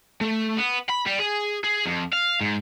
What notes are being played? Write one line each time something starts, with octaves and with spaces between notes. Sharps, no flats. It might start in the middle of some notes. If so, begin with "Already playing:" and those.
A3
B3
B5
G3
G#4
G#4
F2
F5
G#2